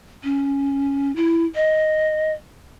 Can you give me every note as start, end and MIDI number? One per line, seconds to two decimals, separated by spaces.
0.24 1.14 61
1.16 1.45 64
1.55 2.32 75